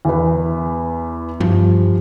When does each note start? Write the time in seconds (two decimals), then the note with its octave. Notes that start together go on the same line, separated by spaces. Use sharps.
0.05 E2 B4
1.40 G2 F3 G4